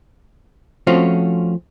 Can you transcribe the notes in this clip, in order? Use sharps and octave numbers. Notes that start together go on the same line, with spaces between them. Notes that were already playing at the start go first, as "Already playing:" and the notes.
F3 A3 C4 C#4 F4 F#4